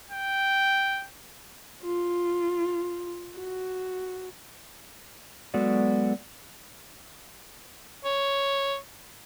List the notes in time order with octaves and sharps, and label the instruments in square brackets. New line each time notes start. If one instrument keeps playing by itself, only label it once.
[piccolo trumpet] G5
[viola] F4
F#4
[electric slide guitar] F#3 G#3 B3 F#4 A4 D5
[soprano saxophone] C#5